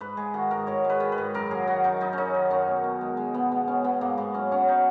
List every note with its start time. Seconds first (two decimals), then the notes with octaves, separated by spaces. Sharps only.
0.01 G#2 B4
0.17 G#3 G#4
0.34 D#3 F#4
0.51 G#2 A#4
0.67 G#2 C#5
0.85 G#3
0.90 B4
1.00 D#3
1.12 B4
1.18 G#2
1.34 F#2 A#4
1.51 F#3 G#4
1.68 D#3 F#4
1.84 F#2 D#4
2.01 F#2 D#4
2.13 F#3 C#4 D#4
2.34 D#3
2.50 F#2 C#4
2.68 B2
2.84 B2
3.01 G#3
3.17 G#3
3.34 B2 B3
3.52 B2 B3
3.68 G#3 C#4
3.84 G#3 B3
4.01 G#2 A#3
4.18 G#2 B3
4.34 F#3 C#4
4.52 F#3 C#4
4.68 D#4